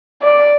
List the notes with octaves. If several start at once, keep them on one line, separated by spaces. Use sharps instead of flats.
D5